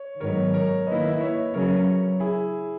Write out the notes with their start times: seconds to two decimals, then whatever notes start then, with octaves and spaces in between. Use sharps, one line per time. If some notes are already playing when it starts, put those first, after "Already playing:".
Already playing: C#5
0.20 G#2 D#3 F#3 B3 A#4 C#5
0.54 A#4 C#5
0.87 D#3 A#3 E4 B4 D#5
1.21 C#5 E5
1.54 C#3 F#3 C#4 A#4 C#5
2.20 E4 G#4